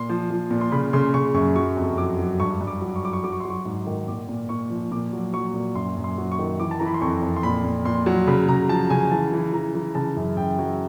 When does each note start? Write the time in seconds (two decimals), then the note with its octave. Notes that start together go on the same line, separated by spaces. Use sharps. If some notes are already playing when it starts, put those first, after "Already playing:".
Already playing: A#2 C6
0.09 F3
0.30 F3
0.51 A#2
0.61 C6
0.72 C#3 B5
0.93 C#3 C6
1.14 C#3 C#6
1.34 F#2 C#6
1.56 F#3 C#6
1.77 F2
1.98 F#3 D6
2.19 F#3
2.40 G2 C#6
2.61 G2
2.67 D6
2.81 F#3
2.96 C#6
3.03 F#3 D6
3.13 C#6
3.24 F#3 D6
3.33 C#6
3.40 C6
3.45 F#3 C#6
3.66 G#2
3.86 D#3
4.08 A#2 D6
4.29 A#2
4.49 A#2 C#6
4.70 F3
4.92 A#2 D6
5.13 F#3
5.33 F#3 C#6
5.54 A#2
5.75 F#2 C6
5.97 F#2
6.04 C6
6.18 F#3
6.32 C#6
6.39 D#3
6.60 E3 D6
6.71 A5
6.79 E3 A#5
6.86 B5
6.94 C6
7.02 F2 C#6
7.22 F2
7.37 C6
7.43 A#2 B5
7.64 A#2
7.85 A#2 C6
8.06 F#3
8.27 C#3 B5
8.49 C#3 A#5
8.69 F3 A5
8.90 C#3 G#5
9.11 E3 A5
9.33 E3
9.53 E3 A#5
9.75 E3
9.95 C#3 A5
10.17 F#2
10.37 F#2 G5
10.59 F#3